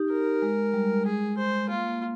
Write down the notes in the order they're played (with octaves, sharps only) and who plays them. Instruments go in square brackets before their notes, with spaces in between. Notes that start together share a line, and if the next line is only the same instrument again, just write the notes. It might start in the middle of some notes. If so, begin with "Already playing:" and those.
Already playing: [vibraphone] D#4 G4
[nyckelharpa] A#4
[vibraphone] G#3
G3
[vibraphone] G#3 [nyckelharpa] G#4
[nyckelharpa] C5
[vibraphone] A#3 [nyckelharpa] F4
[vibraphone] A#3